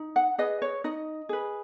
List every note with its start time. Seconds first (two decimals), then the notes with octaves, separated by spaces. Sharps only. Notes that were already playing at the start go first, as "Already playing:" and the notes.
Already playing: D#4
0.16 F#5
0.38 G#4 B4 D#5
0.62 C#5
0.84 D#4 D#5
1.29 G#4 B4